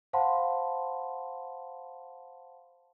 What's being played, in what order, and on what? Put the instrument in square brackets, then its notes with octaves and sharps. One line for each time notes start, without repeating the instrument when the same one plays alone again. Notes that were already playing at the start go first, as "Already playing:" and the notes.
[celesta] C5 F5 F#5 A5 B5 C6